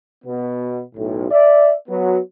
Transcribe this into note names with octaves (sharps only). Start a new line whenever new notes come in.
B2 B3
B1 A2
D5 E5
F#3 B3